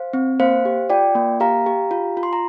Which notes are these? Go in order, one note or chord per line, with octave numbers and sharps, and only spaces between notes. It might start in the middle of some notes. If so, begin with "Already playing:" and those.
Already playing: C5 F5
C4
A#3 C5 F5
G4
F4 D5 G5
A#3
G4 F5 A#5
G4
F4
F4
C6
A#5